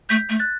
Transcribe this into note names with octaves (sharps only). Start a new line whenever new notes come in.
A3 G6 B6
A3
F#6 A6